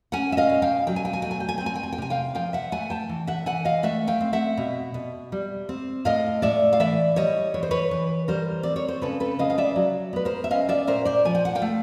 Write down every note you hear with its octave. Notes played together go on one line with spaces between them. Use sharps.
C#4 F#5 G#5
E5
D#5 F5
B2
F5 G5
F#3 G5
G#5
G5
G#5
A3 G5
G#5
G5
G#5
C4 G5
G#5
G5
G#5
G5
C3 G#5
F5 G5
F3 F5 G5
E5 F#5
A3 F#5 G#5
G5 A5
E3
E5 F#5
E3 F#5 G#5
D#5 F5
A3 E5 F#5
F5 G5
C4
E5 F#5
B2
B2
G3
C4
A2 D#5 F5
A2 D5 E5
F5
E3 D5 E5
G3 C#5 D#5
E3 C#5
C5
B4 C#5
E3
G3 A#4 C5
C4 D5
C#5
C5
C#3 A4 B4
A4 B4
C#3 D#5 F5
F5
D5 E5
F#3
B3 B4
A#4 C5
E5
C#4 D#5 F5
D5 E5
A#2 A#4 C5
C5 D5
F3 G#5
G5
F#5
F5 G5
A3